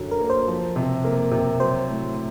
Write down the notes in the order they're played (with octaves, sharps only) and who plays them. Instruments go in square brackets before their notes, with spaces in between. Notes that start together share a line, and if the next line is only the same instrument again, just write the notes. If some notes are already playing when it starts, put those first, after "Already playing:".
Already playing: [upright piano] F#2 D3 F#3
[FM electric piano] A#4
[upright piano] A#3
[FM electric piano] C5
[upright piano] F3
C3
A#3
C3
[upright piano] F#3 [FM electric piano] C5
[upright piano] A2